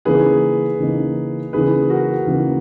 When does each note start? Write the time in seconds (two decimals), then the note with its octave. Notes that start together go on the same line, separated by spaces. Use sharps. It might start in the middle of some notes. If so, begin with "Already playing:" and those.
0.05 C#3 E3 A#3 D#4 G#4 B4
0.80 C#3 E3 A#3 D#4
1.53 C#3 E3 A#3 D#4 G#4 B4
1.90 F#4 A#4
2.27 C#3 E3 A#3 D#4